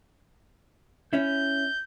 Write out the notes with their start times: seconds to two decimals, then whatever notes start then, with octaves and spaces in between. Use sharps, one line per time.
1.13 C#4 E4 G6